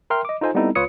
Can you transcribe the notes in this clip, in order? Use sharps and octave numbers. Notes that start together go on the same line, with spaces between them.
A#4 E5 G5 A#5 C6 F6
D#5 D6
D#4 F4 A4 C5 D#5 G#5
G3 B3 C4 D#4 E4 A4
C#2 F4 B4 C#5 D#6 C#7